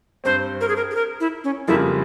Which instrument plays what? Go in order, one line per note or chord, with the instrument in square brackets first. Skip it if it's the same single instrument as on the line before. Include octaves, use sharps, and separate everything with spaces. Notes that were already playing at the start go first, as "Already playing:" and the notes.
[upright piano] G2 G3 C4 [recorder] C5
[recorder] A#4
G#4
A#4
G#4
A#4
E4
C#4
[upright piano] F1 F2 C#3 G3 A#3 [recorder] E4